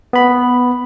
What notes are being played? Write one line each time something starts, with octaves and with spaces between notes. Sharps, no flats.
B3 B5